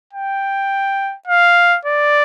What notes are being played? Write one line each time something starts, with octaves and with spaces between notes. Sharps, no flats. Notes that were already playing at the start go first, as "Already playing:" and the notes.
G5
F5
D5